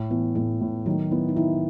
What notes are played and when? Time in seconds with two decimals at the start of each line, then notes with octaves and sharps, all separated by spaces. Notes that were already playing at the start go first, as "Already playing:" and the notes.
Already playing: A2
0.11 E3 B3
0.35 A2 A3
0.61 A2
0.86 D#3 F#3
1.11 B3 E4
1.29 D#4
1.37 D#3 E4